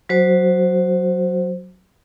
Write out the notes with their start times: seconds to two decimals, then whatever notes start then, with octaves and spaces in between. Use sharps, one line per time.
0.09 F#3 F#4 C5